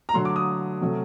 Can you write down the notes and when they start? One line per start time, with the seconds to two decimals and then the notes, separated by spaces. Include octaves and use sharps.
0.09 A#5
0.13 D3 F#3 A3 C6
0.25 D6
0.36 D#6
0.81 C3 F#3 A3